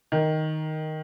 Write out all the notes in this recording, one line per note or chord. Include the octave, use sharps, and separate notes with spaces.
D#3